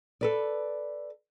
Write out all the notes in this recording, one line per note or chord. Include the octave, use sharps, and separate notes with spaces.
A4 B4 D5